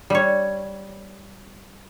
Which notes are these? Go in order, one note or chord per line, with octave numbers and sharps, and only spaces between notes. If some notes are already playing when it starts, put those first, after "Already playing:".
G3 C#5